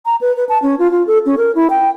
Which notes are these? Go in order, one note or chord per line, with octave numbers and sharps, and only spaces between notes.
A#5
B4
B4
A5
C#4
F4
F4
A4
C#4
A#4
E4
G5